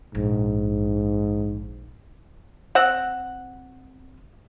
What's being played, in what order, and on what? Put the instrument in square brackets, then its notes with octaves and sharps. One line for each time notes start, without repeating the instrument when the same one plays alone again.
[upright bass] A#1 [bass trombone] G#2
[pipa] C4 F#5